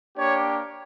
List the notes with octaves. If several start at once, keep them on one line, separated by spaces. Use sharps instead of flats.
A#3 D4 G4 C#5